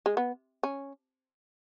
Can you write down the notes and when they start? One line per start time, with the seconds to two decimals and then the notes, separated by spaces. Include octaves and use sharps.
0.06 G#3
0.17 B3
0.63 C#4